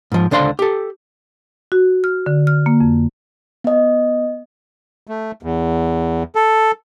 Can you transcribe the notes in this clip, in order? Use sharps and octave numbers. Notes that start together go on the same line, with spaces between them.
G#2 F3
C#2 D3 D4 C5 F5 C6
G4 A4
F#4
F6
D3
F6
A#3
F2
B3 D#5
A3
E2
A4